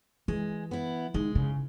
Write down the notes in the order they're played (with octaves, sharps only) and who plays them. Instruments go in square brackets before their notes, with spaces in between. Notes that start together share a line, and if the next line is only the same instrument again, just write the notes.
[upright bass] E3 [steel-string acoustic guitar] G#3
[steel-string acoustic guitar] B3 E4
[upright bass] D#3 [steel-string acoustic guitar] G#3
[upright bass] C#3